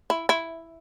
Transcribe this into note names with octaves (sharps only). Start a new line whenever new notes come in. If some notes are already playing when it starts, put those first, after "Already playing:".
E4
E4